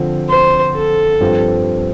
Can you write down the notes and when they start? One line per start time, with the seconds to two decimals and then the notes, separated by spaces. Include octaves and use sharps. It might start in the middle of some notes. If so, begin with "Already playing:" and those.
Already playing: D3 F3 C4
0.29 C5
0.75 A4
1.20 G2 F3 C4 F4